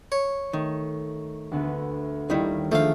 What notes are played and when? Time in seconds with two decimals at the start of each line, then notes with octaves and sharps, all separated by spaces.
0.12 C#5 C#7
0.53 D#3 A3
1.51 D2 B3 E5
2.30 D#2 D#3 G3 E4
2.72 D#3 F3 G#3 A3 D4 F5